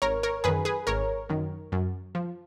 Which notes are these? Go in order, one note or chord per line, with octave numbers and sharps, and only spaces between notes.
G#1 A#4 C#5
A#4 C#5
F#2 D#3 G#4 B4
G#4 B4
G#1 A#4 C#5
F#2 D#3
F#2
F3